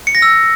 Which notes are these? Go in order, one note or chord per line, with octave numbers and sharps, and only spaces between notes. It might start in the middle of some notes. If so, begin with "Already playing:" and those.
C#7
A#6
E6